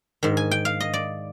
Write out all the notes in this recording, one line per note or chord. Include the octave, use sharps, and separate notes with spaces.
G#2 D#3
G#5
G5
F5
D#5
D5